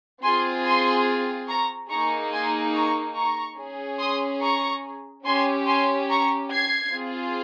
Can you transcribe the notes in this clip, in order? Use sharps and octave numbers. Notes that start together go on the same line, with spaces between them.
C4 F4 G#4 G#5 C6
G#5 C6
A#5 C#6
A#3 D#4 G#4 A#5 C#6
G#5 C6
A#5 C#6
A#5 C#6
C#4 G#4
C6 D#6
A#5 C#6
C#4 G4 G#5 C6
G#5 C6
A#5 C#6
G#6 C7
C4 F4 G#4